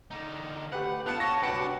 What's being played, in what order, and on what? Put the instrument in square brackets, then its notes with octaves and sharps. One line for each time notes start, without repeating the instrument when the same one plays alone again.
[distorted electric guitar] D3 D#4
[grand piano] A3 G4 B4 [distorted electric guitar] F#5
[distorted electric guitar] A3 F4 [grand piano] B3 F#6 C#7 [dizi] A5
[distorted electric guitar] A4 C#5 [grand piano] C#6 [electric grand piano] A#6
[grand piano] C2 F#3 B4 [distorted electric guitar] D4 [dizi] F#5 [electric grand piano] G5 C#7